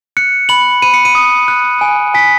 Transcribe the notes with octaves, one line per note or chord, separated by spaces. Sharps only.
F#6 C#7
B5 F#7
B5 D#7
C#7
D#7
D#6
F#6
G#5
G#5 B6